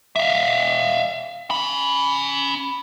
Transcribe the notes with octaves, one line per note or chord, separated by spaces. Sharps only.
E5 F5
C#4 B5